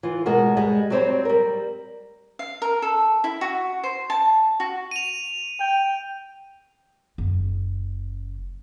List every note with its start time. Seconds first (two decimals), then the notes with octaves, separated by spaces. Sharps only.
0.03 E3 F4
0.26 B2 G#3 B3 F#4 A#4
0.57 G3 G#3
0.90 F#3 G3 C4 A4 C5 C#5
1.25 G3 A#4
2.39 F5
2.62 A#4
2.82 A4
3.24 E4
3.41 F#4
3.84 C5
4.10 A5
4.60 F#4
4.91 D#7 F7
5.60 G5
7.18 F#1 C#3